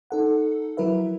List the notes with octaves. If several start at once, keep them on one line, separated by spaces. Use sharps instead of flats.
D#4 A4 F#5
F3 F#3 E4 A#4 B4 E5